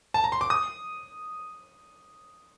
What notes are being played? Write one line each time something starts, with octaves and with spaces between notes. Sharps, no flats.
A5
A#5
C6
D6
D#6